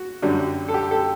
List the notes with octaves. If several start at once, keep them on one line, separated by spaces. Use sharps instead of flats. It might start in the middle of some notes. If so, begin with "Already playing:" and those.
Already playing: F#4
F#2 D3 G3
A4
G4
A4